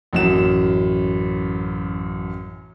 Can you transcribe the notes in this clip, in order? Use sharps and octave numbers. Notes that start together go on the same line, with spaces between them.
A1 F#2 E7